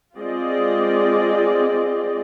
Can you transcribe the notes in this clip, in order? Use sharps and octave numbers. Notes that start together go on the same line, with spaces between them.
G#3 C4 F4 G#4 D5 D#5